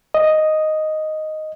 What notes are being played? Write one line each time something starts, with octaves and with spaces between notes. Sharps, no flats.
D#5